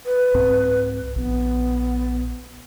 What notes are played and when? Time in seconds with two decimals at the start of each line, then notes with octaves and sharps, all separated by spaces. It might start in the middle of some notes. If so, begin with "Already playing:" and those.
0.06 B4
0.34 C2 G#2 C4
1.16 A#1 B3